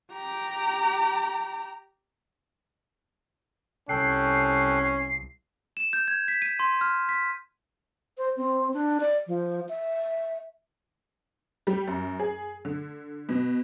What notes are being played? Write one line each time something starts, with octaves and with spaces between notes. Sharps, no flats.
G4 A#5
C2 C#4 A4 G5 F#6 C7
E7
G6
G#6
B6
D#7
C6
F6
B6
C5
C4
D4
D5
F3
E5
G3
F#2
G#4
D3
B2